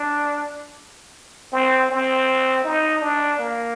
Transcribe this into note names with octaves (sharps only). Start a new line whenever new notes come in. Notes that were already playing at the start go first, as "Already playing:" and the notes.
Already playing: D4
C4
C4
D#4
D4
A#3